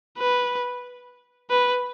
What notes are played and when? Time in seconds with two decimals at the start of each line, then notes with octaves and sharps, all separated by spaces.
0.19 B4
1.50 B4